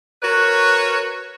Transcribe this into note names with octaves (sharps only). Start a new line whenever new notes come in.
F#4 A#4 B4 C#5